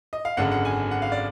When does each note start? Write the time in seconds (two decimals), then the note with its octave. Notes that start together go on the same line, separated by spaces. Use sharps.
0.13 D#5
0.25 F5
0.37 G#1 F#2 D3 G#3 F#5
0.52 F#5
0.65 G#5
0.91 F#5
1.02 F5
1.12 D5